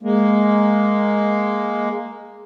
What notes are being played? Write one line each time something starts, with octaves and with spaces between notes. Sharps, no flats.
G#3 A#3